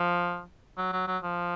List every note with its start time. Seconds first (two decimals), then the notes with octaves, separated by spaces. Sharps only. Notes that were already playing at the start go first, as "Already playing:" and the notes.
Already playing: F3
0.78 F#3
0.93 F#3
1.07 F#3
1.23 F3